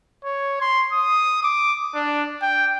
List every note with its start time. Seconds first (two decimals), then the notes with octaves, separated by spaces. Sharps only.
0.24 C#5
0.61 C6
0.93 D#6
1.43 D6
1.95 D4
2.42 G5